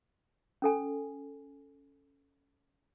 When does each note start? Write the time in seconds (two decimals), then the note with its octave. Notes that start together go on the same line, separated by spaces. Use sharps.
0.62 C#4 A4 G#5